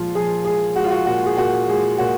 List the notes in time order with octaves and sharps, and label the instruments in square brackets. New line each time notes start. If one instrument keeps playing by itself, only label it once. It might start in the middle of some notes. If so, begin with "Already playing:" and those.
Already playing: [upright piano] A#2 F3 G#3 F4
F3 G#4
G#3 G#4
G#3 F#4
F4
F#4
A#2 F#4
G#4
A#2 F#4
G#3 G#4
A#2 F#4